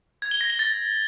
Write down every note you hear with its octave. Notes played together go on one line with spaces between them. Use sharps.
G#6
G7
A#6
G7
A6